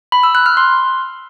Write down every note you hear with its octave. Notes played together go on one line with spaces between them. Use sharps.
B5
E6
F#6
F6
C6